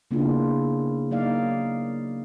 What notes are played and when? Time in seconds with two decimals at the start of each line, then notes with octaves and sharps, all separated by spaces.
0.11 C#3 A#3 B3 D4 E4 F4
1.11 F#3 A#3 D#4 D5 F5